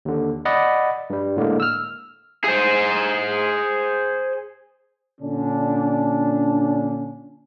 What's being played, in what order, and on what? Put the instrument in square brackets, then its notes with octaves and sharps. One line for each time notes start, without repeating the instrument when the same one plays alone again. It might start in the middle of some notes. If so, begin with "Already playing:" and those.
[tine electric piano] D#2 D3
D5 D#5 F#5 B5
G2 G3
A2 D3 G#3 A#3
E6 F6
[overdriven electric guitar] G#4 C5
[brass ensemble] A#2 D3 C#4 D4